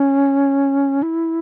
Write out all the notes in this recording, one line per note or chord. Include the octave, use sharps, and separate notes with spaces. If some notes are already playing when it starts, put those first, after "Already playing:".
Already playing: C#4
E4